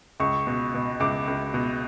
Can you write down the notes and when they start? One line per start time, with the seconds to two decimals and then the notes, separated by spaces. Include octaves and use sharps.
0.20 C#2 C#6
0.47 B2
0.74 B2
1.00 C#2 D6
1.28 C#2
1.54 B2